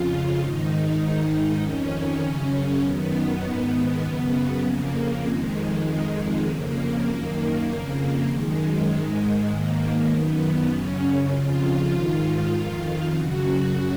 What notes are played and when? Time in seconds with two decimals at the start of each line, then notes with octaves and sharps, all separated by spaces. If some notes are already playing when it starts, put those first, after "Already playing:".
Already playing: F2 C#3 F4
0.39 G#2 D#3 D#4
1.00 G#2 D#3
1.60 F2 D#3 C#4
2.21 F#2 C#3
2.82 F#2 D#3 B3
3.43 G#2 D#3
4.03 F#2 C#3
4.64 F2 C#3 A#3
5.24 F2 D#3 G#3
5.86 F2 D#3
6.45 F2 C#3 A#3
7.07 F#2 D#3
7.67 F2 C#3
8.28 F#2 D#3 G#3
8.89 G#2 D#3 G#3
9.49 G#2 D#3 A#3
10.10 F#2 D#3 B3
10.70 F#2 C#3 C#4
11.31 F2 C#3 F4
11.92 G#2 D#3
12.53 F2 D#3 F4
13.13 F#2 C#3 F#4